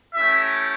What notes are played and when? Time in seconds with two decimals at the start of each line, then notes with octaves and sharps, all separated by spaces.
0.15 A3 C#4 E4 G4 E5